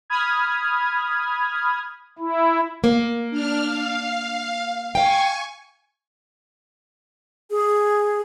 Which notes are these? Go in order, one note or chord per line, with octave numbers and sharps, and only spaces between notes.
B5 D#6 F6 G#6
E4
A#3
D4 F6
F5
F5 G5 G#5 C#6
G#4